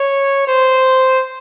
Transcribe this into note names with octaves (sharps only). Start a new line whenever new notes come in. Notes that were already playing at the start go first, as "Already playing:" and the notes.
Already playing: C#5
C5